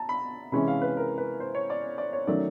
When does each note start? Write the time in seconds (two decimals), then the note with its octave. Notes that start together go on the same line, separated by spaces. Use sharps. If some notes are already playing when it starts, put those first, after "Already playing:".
Already playing: A5 A#5
0.09 B5
0.52 C3 E3 G#3 C#4 B5
0.68 F5
0.82 B4
0.97 A#4
1.18 B4
1.40 C5
1.55 C#5
1.70 D5
1.98 D5
2.13 C#5
2.27 D#3 F#3 A3 C#4 D5